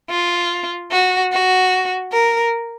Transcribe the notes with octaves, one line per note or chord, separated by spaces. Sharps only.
F4
F#4
F#4
A#4